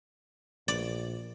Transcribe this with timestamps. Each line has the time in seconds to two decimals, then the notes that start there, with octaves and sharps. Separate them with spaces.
0.68 A#1 D5